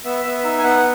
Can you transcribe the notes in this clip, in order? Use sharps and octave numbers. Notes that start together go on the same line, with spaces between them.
B3 E5
B3 E5
D#4 E5
G#5
B3 F#5